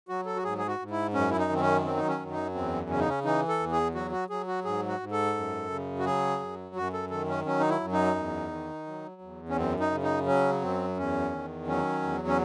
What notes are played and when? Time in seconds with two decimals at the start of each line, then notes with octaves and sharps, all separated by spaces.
0.09 F#3 F#4
0.26 A4
0.36 F#4
0.44 G#2 G#4
0.58 G#4
0.67 F#4
0.79 G#2
0.91 E4
1.14 F#2 C#4
1.31 E4
1.38 D#4
1.49 D#3 C4
1.61 C#4
1.84 F#3 C4
1.96 D#4
2.07 C#4
2.19 F#2
2.31 D#4
2.55 E2 C4
2.90 C#3 C#4
2.99 D#4
3.09 C#4
3.24 E3 D#4
3.48 A4
3.59 E2
3.72 G#4
3.95 F#3 F#4
4.12 F#4
4.30 F#3 G#4
4.47 F#4
4.64 G#2 G#4
4.88 F#4
5.00 G#2
5.12 A4
5.35 F#2
5.70 C#3
5.99 F#4
6.06 F#3 G#4
6.40 F#2
6.75 F#2 F#4
6.93 A4
7.10 D#3 A4
7.28 C#4
7.46 F#3 C#4
7.59 D#4
7.70 E4
7.81 F#2
7.92 D#4
8.16 E2
8.51 D#3
8.87 F#3
9.21 E2
9.49 C#4
9.56 F#2 C4
9.80 D#4
9.91 C#3
10.03 D#4
10.26 F#3 C#4
10.62 F#2 C4
10.97 E2 C#4
11.32 D#3
11.68 F#3 C#4
12.02 E2
12.28 C#4